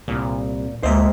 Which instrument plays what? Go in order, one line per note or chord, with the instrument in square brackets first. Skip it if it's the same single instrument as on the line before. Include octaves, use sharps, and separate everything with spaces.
[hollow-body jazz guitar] C2 [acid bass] A#2
[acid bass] D2 [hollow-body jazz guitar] G#3 A#3 C5 [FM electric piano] D#5 E5